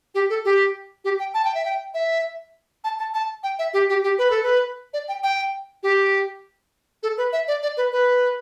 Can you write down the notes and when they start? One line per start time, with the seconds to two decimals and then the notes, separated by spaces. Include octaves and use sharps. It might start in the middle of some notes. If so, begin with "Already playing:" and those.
0.15 G4
0.30 A4
0.45 G4
1.05 G4
1.19 G5
1.34 A5
1.44 G5
1.55 E5
1.65 G5
1.94 E5
2.84 A5
2.99 A5
3.14 A5
3.43 G5
3.59 E5
3.74 G4
3.89 G4
4.03 G4
4.18 B4
4.31 A4
4.43 B4
4.93 D5
5.08 G5
5.23 G5
5.83 G4
7.03 A4
7.17 B4
7.33 E5
7.48 D5
7.63 D5
7.77 B4
7.92 B4